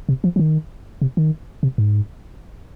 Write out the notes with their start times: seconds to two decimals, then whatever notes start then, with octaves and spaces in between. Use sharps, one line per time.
0.09 C3
0.24 F3
0.36 F3
0.39 D#3
1.02 C3
1.17 D#3
1.63 C3
1.78 G#2